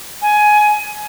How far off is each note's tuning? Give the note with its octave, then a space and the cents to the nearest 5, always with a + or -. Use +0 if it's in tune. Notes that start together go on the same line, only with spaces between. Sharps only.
G#5 +15